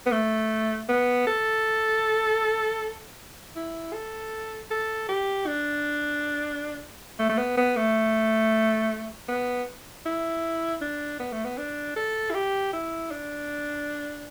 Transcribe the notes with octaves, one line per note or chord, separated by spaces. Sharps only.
B3
A3
B3
A4
E4
A4
A4
G4
D4
A3
A3
B3
B3
A3
B3
E4
D4
B3
A3
B3
D4
A4
E4
G4
E4
D4